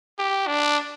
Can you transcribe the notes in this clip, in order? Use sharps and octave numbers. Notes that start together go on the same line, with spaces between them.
G4
D4